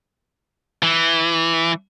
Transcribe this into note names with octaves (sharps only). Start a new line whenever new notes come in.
E3